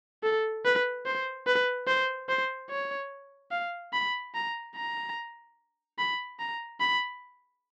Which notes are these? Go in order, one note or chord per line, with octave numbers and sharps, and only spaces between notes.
A4
B4
C5
B4
C5
C5
C#5
F5
B5
A#5
A#5
B5
A#5
B5